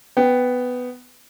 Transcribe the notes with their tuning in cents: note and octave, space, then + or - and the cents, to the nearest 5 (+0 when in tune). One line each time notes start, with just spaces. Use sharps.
B3 +10 G5 +0